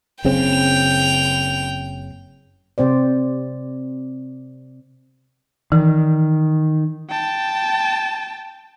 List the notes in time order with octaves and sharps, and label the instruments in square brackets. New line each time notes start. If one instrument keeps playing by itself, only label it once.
[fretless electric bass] F#1 C#3 C4 [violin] G5 F7
[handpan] C3 C4 C5 D5
[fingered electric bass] D#3 [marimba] E3
[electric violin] G5 A5